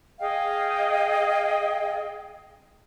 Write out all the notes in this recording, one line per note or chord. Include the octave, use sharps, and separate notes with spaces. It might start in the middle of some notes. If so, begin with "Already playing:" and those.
G#4 D#5 F5 G5